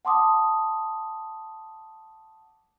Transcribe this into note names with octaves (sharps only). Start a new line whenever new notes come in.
F#5 A5 C6 D6 D#6